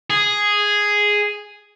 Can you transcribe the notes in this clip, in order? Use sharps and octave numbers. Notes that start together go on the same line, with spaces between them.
G#4